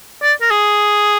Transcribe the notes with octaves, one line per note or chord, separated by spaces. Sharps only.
D5
A#4
G#4